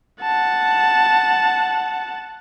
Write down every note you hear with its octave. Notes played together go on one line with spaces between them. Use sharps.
F#5 A5